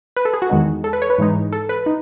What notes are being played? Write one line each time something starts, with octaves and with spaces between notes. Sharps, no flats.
B4
A4
G#4
F#4
E2 D#3 G#3 D#4
A4
B4
C#5
B4
G#2 E3 G#3 D#4
A4
B4
D#4